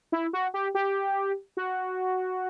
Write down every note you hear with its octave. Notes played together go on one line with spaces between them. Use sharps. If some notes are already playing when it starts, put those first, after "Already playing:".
E4
F#4
G4
G4
F#4